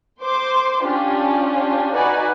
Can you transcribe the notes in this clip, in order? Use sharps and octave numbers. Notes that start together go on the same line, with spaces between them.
C5 C6 D6
C#4 D4 F4 G4
D#4 F#4 B4 D5 F#5 G#5